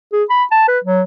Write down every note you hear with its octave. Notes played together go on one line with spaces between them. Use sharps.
G#4
B5
A5
B4
F#3